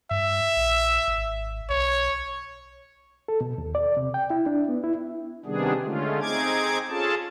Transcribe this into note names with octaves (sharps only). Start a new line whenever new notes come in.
G2 E5
A#1
G#1
B1 C#5
A4
B2
D#2
D5
C3
G5
E4
D4
B3
E4
C3 D#3 G3 B3 D4 G#4
D3 G#3 A3 C#4 F4
C4 D#4 G#4 D6 G#6
C#4 F4 G#4 A4 A5